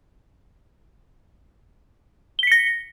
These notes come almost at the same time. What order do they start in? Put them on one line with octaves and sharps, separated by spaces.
G7 B6 C#7 A#6